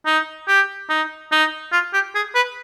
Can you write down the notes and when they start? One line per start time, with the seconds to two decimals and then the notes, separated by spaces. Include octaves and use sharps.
0.06 D#4
0.48 G4
0.89 D#4
1.32 D#4
1.72 F4
1.93 G4
2.15 G#4
2.35 B4